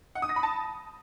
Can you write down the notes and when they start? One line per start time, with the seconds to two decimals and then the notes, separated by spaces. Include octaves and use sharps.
0.15 F#5
0.22 D#6
0.29 A#6
0.36 B5
0.43 A5